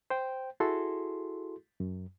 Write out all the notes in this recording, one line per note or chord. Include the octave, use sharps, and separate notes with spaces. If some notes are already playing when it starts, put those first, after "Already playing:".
C5 G5
E4 F#4 G#4 A4 C6
F#2